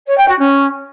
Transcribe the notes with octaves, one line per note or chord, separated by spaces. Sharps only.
C#5
G5
F#4
C#4